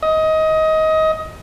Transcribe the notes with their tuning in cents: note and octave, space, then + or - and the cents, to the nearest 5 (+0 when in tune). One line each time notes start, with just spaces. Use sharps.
D#5 +20